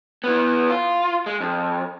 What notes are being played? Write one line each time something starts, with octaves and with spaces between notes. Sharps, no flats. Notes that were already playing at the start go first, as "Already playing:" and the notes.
E3 B3
F4
G#3
F2